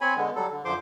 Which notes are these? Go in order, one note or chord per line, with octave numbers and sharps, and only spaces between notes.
C4 C#5 G#5 B5
D3 G#3 B3
F#3 G3 A4
D3
F#2 D3 F3 C5 C6 D6